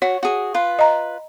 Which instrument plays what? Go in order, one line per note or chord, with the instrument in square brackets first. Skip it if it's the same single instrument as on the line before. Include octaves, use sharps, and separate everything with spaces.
[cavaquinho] F#4 [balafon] C#5
[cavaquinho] F#4 G#4
F4 B4
[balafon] D#5 A#5